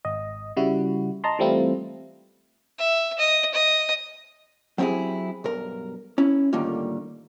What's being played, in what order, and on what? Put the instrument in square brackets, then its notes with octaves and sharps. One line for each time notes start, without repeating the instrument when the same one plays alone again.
[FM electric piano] G#1 D#5
C#3 G3 E4 F#4
D#5 A5 A#5 C6
E3 G3 A3 C4 E4 F4
[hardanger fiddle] E5
D#5
D#5
[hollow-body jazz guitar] F#3 C4 C#4 E4 G4 G#4
B1 G2 A#4
C#4 E4
A2 D3 D#3 G3 A#3 F4